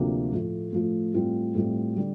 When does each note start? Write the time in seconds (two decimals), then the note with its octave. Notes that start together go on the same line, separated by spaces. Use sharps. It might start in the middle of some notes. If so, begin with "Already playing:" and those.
Already playing: D2 C3 F3 A#3 D4
0.32 A2 F3 A3
0.73 A2 F3 A3
1.14 A2 G3 C4 F4
1.55 A2 G3 C4 F4
1.96 D3 G3